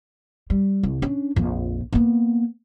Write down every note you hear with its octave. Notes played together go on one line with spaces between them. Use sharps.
G3
C2
C#4 D4
A#1 F2
A#3 B3